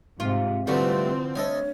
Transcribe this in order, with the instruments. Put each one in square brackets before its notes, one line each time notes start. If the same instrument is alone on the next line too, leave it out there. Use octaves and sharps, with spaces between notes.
[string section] G#2 C3 [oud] F4
[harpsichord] D3 E3 F3 [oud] G3 A3 F#4 [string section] C4 [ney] B4
[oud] D2 [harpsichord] A4 D#5 G#5 [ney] C#5